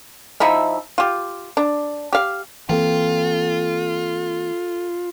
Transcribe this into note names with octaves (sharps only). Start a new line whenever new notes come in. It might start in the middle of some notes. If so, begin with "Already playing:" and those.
F3 D#4 E4 E5
F4 G4
D4
G4 F5
E3 A#3 C4 F4 A4 G5